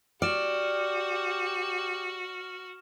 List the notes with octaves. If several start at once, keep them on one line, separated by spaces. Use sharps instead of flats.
F#4 G4 D5 F6 E7